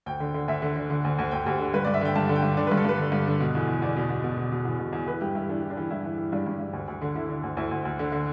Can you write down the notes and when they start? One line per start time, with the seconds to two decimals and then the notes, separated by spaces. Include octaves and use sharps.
0.06 D2 G5
0.20 D3
0.34 D3
0.48 D2 E5
0.62 D3
0.76 D3
0.90 D3
1.05 D2
1.19 D2
1.31 D2 G5
1.46 D2 G4
1.59 D3
1.74 G2 B4
1.85 G2 D5
1.94 E5
2.01 D3 G5
2.15 G2 A5
2.29 D3
2.36 G5
2.42 G2
2.57 D3 D5
2.67 G2 B4
2.77 A4
2.84 G2 B4
2.99 D3
3.12 G2
3.27 D3
3.40 B2
3.55 E2
3.68 E2
3.82 E2 D5
3.96 B2
4.10 B2
4.24 B2
4.38 B2
4.52 B2
4.65 E2
4.79 B2
4.93 E2
5.07 E3 B4
5.21 G2 G4
5.35 G2 E4
5.49 E3 D4
5.62 E3
5.70 D4
5.77 E3
5.90 G2 E4
6.05 E3
6.18 E3
6.32 G2 D4
6.47 G2
6.60 G2
6.73 D2
6.88 D2
7.02 D3
7.15 D3 E4
7.29 D3
7.43 D2
7.57 D2 E4
7.71 D2
7.85 D2
7.99 D3
8.12 D3